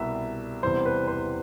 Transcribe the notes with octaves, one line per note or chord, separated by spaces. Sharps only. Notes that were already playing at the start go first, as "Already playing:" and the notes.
Already playing: C2 B2 G3 E5
E1 E2 C3 E3 G3 C5
B4
C5